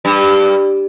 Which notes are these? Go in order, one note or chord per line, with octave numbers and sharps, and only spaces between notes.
G2